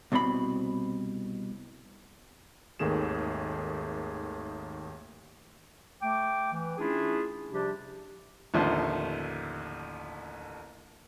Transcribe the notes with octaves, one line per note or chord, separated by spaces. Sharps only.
C2 B2 C4 A#4 B5
G#1 D#2 D#3 A3 G#4 E7
A3 G5 D6
E3
A3 C#4 D4 E4 F4 G#4
C3 F3 G3 D4 G4
A1 D#2 D3 F3 A3 C5